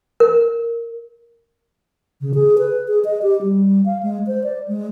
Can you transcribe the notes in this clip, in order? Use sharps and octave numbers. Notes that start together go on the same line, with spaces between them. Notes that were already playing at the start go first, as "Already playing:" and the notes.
A#4
C#3
G#4
B4
G#4
D#5
G4
G3
F5
G#3
C5
D5
G#3